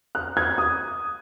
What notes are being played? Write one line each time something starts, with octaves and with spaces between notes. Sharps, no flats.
F#6
G#6
D#6